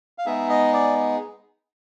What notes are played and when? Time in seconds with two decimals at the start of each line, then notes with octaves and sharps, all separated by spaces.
0.18 F5
0.26 G#3 B3 D#4 G#4 E5
0.50 D#5
0.73 D5